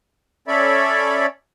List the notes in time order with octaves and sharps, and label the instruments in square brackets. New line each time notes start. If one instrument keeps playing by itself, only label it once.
[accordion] C#4 A4 C#5 D5 E5 B5